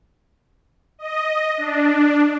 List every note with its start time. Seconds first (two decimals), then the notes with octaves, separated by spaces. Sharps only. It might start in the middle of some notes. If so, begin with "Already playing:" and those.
0.99 D#5
1.58 D4